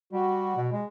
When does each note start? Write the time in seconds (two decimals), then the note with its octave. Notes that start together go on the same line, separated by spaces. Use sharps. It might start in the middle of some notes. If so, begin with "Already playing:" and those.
0.13 G3 F#4
0.56 B2
0.72 G#3